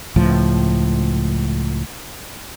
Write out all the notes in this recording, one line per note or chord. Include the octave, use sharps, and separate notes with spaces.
C#2 A2 F3